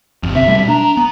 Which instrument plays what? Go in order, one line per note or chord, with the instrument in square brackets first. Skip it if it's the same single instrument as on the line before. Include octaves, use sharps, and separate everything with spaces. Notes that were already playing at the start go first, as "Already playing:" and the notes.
[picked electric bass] G1 F2
[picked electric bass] C3 C4 [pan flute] E5
[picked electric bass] B2 G3 A3
[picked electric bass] D4 [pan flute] A#5
[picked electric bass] B3